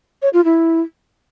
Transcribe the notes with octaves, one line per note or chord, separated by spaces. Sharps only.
C#5
F4
E4